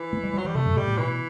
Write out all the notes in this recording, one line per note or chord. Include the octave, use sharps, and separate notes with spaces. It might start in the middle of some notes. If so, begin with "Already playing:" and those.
Already playing: E3
A3
G3
F#3 G3
E3 G3
C3 A3
F#2
B2
A2 G3
A2
B2 E3